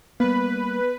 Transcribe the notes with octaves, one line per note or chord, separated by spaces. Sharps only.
G3 A#3 B3 B4